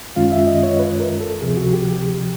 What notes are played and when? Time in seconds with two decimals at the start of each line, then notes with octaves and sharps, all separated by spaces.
0.16 F#2 D#3 G#3 C#4 F4 F5
0.32 E5
0.47 D#5
0.63 C#5
0.79 B4
1.00 A#4
1.20 A4
1.41 D2 C3 F3 G#4
1.57 F#4
1.73 G4
1.89 G4